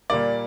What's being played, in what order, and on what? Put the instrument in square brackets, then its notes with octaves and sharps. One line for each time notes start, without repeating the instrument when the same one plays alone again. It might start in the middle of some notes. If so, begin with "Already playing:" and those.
[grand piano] A#2 G3 A#3 D5